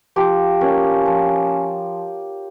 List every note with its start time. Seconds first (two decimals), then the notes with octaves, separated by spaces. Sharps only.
0.16 F3 G4
0.61 A#3 C#4
1.06 F3